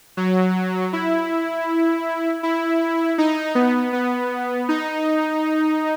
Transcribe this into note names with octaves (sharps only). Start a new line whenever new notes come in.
F#3
E4
E4
D#4
B3
B3
D#4